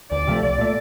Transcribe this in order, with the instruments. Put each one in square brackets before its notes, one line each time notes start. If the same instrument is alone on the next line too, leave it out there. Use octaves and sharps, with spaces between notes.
[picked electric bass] D2 [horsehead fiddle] D5
[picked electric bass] C3 F3 A3
[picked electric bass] C2 [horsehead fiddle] D5
[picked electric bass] A#2 A3